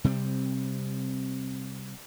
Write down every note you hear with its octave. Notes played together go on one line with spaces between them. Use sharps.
C3 G3 C4